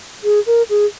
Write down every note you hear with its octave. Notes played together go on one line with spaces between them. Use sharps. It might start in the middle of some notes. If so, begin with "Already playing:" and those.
G#4
A#4
G#4